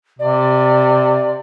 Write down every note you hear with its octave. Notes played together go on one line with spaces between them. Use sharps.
C3 D5